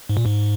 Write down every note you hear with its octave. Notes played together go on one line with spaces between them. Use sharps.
G#2
A#2
G#2